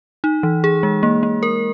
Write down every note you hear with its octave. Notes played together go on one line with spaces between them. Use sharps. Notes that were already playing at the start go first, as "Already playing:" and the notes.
D#4
E3
G#4
G#3
A#3
A#3
A#4